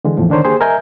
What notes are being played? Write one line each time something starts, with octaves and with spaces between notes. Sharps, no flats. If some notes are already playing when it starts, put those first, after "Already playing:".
D3 E3 G#3
E2 A2 F3
D3 D#3 D4 A#4 C5 C#5
A#3 G4 G#4 C5
A#4 D#5 E5 G#5 G6